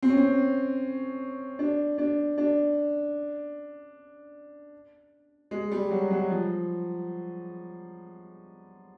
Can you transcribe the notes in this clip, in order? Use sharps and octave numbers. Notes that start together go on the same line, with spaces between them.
C4
C#4
C4
D4
D4
D4
G#3
G3
F#3
F#3
F3